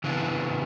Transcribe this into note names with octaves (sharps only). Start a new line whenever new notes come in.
C#3 E3 B3 D4